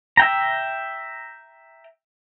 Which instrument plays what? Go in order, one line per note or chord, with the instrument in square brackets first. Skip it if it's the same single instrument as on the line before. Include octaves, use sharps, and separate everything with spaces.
[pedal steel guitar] E5 G5 A#5